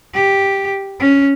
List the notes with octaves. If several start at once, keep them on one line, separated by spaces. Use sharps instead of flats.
G4
C#4